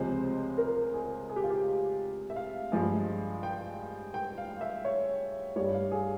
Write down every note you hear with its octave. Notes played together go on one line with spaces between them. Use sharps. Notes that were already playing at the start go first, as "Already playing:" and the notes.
Already playing: C#2 C3 F3 G#3 C5
A#4
G#4
G#4
G4
F4
G4
E5
F5
G2 F3 G#3
G5
G5
F5
E5
C#5
G2 G3 C#5
F5
G#4